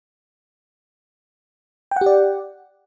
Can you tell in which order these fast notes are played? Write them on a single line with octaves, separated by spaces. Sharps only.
G5 F#5 G4 D5